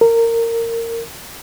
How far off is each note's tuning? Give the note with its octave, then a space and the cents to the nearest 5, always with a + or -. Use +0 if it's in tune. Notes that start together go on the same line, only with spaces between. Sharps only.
A#4 -20